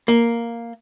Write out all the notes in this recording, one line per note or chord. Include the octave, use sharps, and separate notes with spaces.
A#3